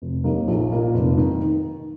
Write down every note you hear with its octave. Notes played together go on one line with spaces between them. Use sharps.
F1
D#2 D#3 A#3 D#4
A#1
A#2 A#3 D#4
F1
D#3